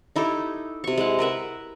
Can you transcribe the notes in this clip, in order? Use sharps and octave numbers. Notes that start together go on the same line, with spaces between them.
D#4 E4 G4 A4
C3 C#6
G#3 E4 F#5
A#4 B4 E5 F#5